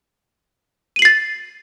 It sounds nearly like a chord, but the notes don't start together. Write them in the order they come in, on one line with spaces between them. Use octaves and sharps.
D#7 F#7 C7 A6